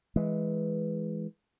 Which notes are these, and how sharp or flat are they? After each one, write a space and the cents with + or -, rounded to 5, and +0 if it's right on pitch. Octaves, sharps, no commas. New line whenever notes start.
E3 +0 G#3 +10